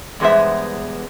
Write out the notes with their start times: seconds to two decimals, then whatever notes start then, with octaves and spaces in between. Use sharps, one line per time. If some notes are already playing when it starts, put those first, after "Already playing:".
0.20 E2 G2 G#3 B3 C5 E5